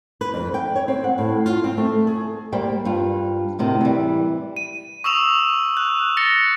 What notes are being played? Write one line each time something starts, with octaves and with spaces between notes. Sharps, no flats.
B4
F2
G5
C#5
C4
F#5
A2
F4
C4
A3
G#4
G3 A#3 C5 G5
G2 F4
A2 C3 D#3
E3 G3
D#7
C#6 D#6 E6 E7 F7
F#6
A6 A#6 C#7 G7